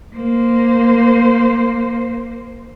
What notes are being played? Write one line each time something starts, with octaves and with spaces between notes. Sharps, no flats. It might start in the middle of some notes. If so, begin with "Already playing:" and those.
A#3 C5